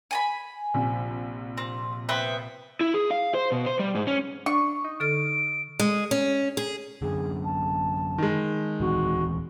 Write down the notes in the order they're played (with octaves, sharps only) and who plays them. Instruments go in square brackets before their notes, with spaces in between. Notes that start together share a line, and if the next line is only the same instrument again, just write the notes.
[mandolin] G#5 A5 B5
[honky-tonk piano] A#1 C3
[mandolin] C4
B3 C4 E5
[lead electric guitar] E4
G#4
F5
C5
B2
C5
G3
G#2
C#4
[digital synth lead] D4 [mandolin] C#6
[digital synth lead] D#4
[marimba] D3 A4 F6 [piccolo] D7
[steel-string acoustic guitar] G#3
C#4
G#4
[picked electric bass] F#2 D3 [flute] G#4
[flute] A5
[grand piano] D#3 G#3
[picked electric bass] D#1 E3 C4 [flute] F#4